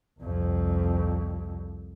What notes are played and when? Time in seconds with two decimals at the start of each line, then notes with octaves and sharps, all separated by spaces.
0.20 C2 F2